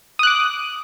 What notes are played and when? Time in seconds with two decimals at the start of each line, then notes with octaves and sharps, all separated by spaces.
0.19 D#6
0.23 F#6
0.27 D6